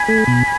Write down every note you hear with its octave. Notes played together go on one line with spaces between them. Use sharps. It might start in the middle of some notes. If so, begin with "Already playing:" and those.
Already playing: G#5 B5
A3
B2